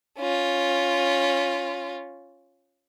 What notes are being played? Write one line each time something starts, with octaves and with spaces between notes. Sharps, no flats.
C#4 F4